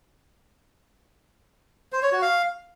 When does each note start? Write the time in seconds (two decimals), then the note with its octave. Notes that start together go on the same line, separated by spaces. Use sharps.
1.93 C5
2.02 C#5
2.12 F#4
2.22 F5